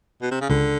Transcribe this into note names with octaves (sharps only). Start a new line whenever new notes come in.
B2
C3
C#3
C#2 D3